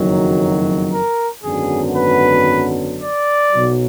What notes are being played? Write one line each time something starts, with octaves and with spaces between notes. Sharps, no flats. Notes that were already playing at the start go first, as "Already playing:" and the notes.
Already playing: F#1 F2 D#3 F#3
A#4
G#1 F#2 D3 F#3 B3 G#4
B4
D5
B1 B2 F#3